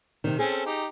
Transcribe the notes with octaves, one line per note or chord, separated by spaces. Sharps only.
C3 D#3
C4 C#4 G#4 A4
D#4 G4